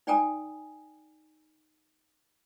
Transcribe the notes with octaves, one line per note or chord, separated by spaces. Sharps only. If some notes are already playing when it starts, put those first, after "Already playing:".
D#4 D5 G5 G#5 A#5 D#6